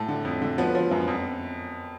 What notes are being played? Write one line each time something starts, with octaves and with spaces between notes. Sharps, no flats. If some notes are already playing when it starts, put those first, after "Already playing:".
Already playing: A2 A4
D3
F2
D3
F3 B3 B4
F3
F#2
F2